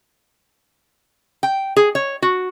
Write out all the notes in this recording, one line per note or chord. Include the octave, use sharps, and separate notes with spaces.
G5
G#4
C#5
F#4